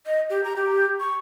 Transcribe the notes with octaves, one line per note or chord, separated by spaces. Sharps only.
D#5
G4
A#5
G4
C#6